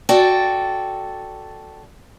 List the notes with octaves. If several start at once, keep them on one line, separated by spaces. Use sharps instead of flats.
F#4 A4 D5 G5